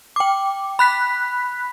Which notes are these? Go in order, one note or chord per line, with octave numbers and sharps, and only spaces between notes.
G5 D6
B5 F#6 B6